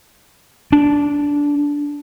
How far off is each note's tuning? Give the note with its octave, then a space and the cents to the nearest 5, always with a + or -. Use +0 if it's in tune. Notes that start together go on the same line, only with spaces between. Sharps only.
D4 -15